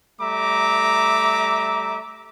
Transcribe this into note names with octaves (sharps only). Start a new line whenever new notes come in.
G3 A3 E5 A#5 D6